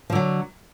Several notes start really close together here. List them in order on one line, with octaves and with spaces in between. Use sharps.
F3 D3 F#3